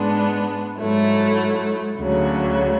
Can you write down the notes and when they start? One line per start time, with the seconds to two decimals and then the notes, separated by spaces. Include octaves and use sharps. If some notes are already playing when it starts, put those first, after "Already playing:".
Already playing: G#2 G#3 B3 D4
0.78 G#2 F#3 A3 E4
1.97 D2 C#3 F#3